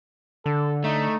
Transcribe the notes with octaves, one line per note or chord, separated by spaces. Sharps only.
D3 A4
A3 D#4